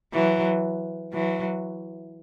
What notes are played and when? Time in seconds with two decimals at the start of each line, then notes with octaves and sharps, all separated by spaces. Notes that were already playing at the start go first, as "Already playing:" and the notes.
0.13 E3 F#3
1.13 E3 F#3